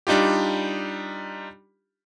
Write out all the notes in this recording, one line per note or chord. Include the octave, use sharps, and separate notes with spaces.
G3 D4 D#4 F4 G4